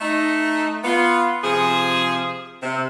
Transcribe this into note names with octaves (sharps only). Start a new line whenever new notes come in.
A3 D#4
B3 F4
C3 F3 G#4
C3